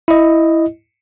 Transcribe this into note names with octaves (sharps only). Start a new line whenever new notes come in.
E4 D#5